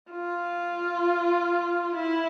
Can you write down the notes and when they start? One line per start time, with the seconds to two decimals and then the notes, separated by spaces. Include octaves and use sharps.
0.11 F4
1.95 E4